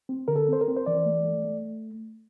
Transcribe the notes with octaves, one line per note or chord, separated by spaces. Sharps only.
C4
D3 A#4
A4
C4 C5
A#4
C4
C5
E3 D5
A3
A3
A3